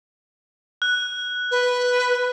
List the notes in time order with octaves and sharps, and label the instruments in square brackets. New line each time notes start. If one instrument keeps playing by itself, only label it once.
[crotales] F#6
[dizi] B4